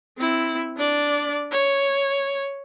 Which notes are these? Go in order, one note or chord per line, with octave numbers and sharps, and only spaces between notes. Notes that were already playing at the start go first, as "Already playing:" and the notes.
C4 E4
D4 D5
C#5